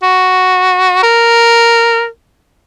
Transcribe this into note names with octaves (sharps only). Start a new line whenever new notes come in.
F#4
A#4